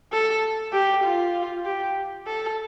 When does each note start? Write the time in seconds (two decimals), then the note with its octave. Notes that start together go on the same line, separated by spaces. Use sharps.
0.12 A4
0.73 G4
1.03 F4
1.64 G4
2.27 A4